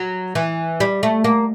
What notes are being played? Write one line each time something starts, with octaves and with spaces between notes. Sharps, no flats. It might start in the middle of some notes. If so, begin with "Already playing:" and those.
Already playing: F#3
E3
G3
A3
A#3